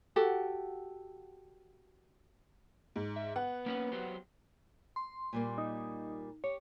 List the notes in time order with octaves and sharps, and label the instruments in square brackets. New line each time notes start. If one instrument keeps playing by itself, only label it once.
[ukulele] F#4 G4 A4 F#5
[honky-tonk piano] G#2
[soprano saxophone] E5
[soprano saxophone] B3 [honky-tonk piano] F#5
[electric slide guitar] A#3 C#4 B4
F#3 G4 C5
[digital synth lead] C6
[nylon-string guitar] A#2 G3 A#3
[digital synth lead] D#4
[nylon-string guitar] G4 [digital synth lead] C#5